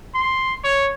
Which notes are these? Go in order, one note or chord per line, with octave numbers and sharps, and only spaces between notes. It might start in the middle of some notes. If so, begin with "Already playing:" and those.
C6
C#5